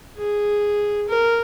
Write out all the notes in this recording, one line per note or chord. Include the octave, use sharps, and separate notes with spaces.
G#4
A#4